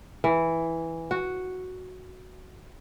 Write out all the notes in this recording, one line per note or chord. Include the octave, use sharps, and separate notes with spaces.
E3
F#4